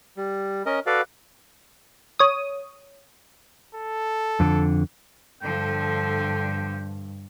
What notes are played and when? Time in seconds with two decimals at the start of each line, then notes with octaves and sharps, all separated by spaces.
0.17 G3
0.66 C#4 A#4 D#5
0.87 F#4 A4 B4 D5 F5
2.19 C#5 D#6
3.75 A4
4.40 F2 D3
5.42 G2 D3 F3 A4 G5